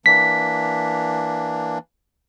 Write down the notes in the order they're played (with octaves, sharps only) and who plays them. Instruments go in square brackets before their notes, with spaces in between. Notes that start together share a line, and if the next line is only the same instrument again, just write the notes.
[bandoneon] E3 A#3 D4 [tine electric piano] B6